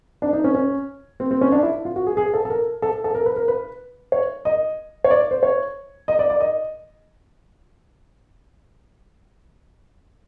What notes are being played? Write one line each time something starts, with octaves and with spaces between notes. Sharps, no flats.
D4
D#4
C#4
C#4
C4
C4
C#4
D4
E4
F4
F#4
G#4
G#4
A4
A4
A#4
A4
A4
A#4
B4
A#4
B4
C#5
D#5
C#5
D5
C5
C#5
D#5
D5
D5
D#5